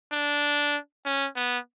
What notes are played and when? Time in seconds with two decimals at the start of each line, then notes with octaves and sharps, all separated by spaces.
0.13 D4
1.06 C#4
1.36 B3